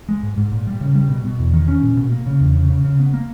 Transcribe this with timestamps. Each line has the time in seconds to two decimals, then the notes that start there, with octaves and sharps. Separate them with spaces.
0.09 G#3
0.23 G#2
0.37 G#2
0.51 A#2
0.67 G3
0.81 C#3
0.95 G3
1.10 B2
1.25 B2
1.39 E2
1.53 D#3
1.68 C#4
1.83 A#2
1.97 B2
2.12 A#3
2.26 C#3
2.41 E2
2.56 C#3
2.70 C#3
2.84 C#3
2.99 B3
3.14 A#3